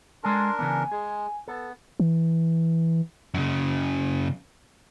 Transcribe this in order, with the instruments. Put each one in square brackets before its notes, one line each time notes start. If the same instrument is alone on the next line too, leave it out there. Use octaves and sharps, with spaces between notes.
[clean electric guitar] G#3 A4 G#5 [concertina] D4 A#4 [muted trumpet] C6
[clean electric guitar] C#3 E3 B3 [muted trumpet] G#5
[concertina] G#3 [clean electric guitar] G#4
[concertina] B3 [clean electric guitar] A4
[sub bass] E3
[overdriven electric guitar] F#2 C#3